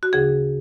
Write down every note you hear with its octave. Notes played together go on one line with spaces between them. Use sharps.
F#4
D2 C#3 F3 G#4